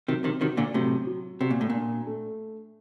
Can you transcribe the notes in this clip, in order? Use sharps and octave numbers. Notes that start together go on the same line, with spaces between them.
C3 D#3 F#3
C3 D#3
C3 D#3 F#4
A#2 D3
A2 C3 F#3
F#3
C3 F#4
A#2
A2
A#2 D4
A3